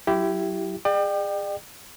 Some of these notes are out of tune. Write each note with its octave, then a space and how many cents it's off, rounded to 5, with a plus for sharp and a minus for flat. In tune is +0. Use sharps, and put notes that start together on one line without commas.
F#3 +20 E4 +15 G4 -10
G#4 -25 D5 +40 G5 +0